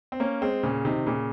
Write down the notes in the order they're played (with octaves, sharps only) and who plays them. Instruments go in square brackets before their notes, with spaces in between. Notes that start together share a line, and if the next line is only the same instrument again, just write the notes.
[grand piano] C4
A#3 C#4
G#3 C4
A#2 C#3
C3 D#3
A#2 C#3